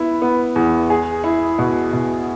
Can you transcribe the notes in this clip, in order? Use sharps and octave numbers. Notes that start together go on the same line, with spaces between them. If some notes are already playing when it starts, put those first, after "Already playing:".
Already playing: B3 E4
B3
E2
G#4
E4
B2
B2